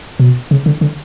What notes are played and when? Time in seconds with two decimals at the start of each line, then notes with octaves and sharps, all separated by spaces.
0.20 B2
0.51 C#3
0.66 D3
0.81 D3